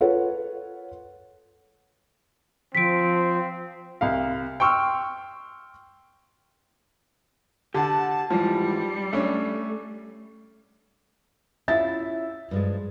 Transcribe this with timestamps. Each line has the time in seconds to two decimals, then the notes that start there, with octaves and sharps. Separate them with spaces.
0.01 F4 A4 B4 C#5 F#5
2.75 F3 C4 B6 D7
4.01 C2 F5
4.60 G5 C6 C#6 E6 F6
7.74 D3 G4 F#5 A5
8.30 G#2 E3 F3 G3
9.13 A3 C#4 D4
11.68 C#4 E4 F4 E5 A6
12.51 G2 F3 G#3